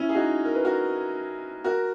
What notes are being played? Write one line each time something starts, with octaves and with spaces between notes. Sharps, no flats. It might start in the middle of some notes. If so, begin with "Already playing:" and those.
Already playing: C#4 E4
G#4
D#4 F#4
A#4
B4
F#4 A#4
F#4 A#4